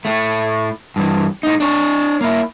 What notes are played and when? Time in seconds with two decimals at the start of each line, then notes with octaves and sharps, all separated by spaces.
0.05 A2 A3
0.96 G2 E3
1.43 A2 D#4
1.60 D4 C#5
2.21 A#3 E4